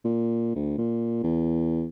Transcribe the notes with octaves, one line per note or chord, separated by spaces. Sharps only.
A#2
D2
A#2
E2